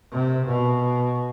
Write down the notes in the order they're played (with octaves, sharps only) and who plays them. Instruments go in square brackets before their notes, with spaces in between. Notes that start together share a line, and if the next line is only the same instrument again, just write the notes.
[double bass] C3
B2